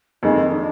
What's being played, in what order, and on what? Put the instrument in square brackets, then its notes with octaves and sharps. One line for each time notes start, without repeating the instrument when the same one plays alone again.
[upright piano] F2 D#3 G#3 [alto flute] D#4
[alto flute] D#4
D4